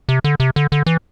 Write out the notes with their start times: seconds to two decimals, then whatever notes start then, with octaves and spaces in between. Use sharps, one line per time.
0.09 C3
0.24 D3
0.40 C3
0.56 D3
0.72 D3
0.86 E3